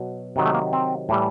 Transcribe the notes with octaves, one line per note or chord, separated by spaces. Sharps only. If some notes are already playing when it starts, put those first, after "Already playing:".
Already playing: B2 F#3
C3 D#3 F#3
A3
A#3
C4
A2 E3 G3